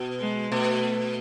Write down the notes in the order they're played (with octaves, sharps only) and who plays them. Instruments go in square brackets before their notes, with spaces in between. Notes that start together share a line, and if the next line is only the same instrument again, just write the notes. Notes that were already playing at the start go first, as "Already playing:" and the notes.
Already playing: [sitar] B2
[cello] G#3
[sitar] B2 [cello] A3